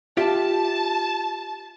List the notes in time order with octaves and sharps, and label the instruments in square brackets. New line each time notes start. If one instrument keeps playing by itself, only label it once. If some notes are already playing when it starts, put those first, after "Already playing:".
[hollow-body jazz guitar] F4 G4 E5 [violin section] A5